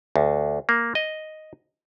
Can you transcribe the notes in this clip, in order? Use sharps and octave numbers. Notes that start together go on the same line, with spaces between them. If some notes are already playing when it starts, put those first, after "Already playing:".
D2
A#3
D#5